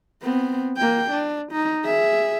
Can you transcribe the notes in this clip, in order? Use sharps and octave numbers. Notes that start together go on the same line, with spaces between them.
B3 C4
A#3 G5
D4
D#4
G#4 E5